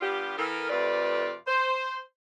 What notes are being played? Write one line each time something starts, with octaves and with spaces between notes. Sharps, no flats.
G3 B3 D4 F4 G4
E3 B3 A4 A#4
F2 C3 A3 F4 B4 D5
C5